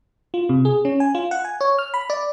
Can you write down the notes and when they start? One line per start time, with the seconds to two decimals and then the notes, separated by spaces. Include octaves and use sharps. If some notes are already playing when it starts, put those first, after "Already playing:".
0.34 F4
0.49 C3
0.65 G#4
0.85 C#4
1.00 G#5
1.15 F4
1.31 F#5
1.45 G#5
1.61 C#5
1.79 F6
1.94 B5
2.10 D5